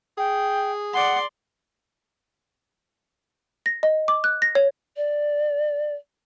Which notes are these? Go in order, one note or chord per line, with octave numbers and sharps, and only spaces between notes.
G#4 G5
D5 F#5 C6
A#6
D#5
D6
F#6
A#6
C#5
D5